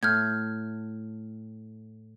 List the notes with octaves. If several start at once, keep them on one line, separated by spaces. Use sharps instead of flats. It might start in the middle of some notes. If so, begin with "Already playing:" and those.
A2 F6 G6 G#6